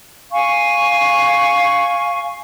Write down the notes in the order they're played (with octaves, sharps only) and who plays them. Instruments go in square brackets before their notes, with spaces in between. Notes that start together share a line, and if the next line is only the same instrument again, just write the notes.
[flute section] F5 G#5 C#6